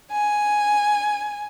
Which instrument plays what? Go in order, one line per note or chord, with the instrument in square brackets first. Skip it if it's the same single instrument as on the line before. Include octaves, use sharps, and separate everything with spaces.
[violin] G#5